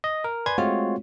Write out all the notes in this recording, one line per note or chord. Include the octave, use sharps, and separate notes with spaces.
D#5
A#4
B4 D5 G#5 B5 C6 G#6
G#3 A3 C4 F4 F#4 C#5